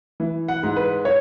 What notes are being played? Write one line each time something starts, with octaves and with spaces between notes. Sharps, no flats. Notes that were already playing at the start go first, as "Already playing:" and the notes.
E3
F#5
G#2
B4
C#5